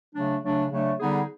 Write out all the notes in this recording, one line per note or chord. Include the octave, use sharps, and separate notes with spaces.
C#3 F#3 A3 D4
C#3 F#3 A3 D4
C#3 F#3 A3 D4
D3 G3 B3 D#4 G#4